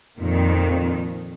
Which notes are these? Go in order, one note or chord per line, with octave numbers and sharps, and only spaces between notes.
F2 A#2 D#3